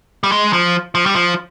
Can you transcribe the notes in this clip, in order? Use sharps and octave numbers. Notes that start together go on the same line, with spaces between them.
G3
G#3
F3
F3
G3
F3